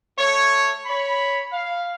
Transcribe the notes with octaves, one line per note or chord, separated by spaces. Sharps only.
A3 C#5
C#5 B5
F5